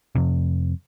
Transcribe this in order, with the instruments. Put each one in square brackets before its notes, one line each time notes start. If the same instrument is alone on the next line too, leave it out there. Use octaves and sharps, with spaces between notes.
[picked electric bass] F2 C3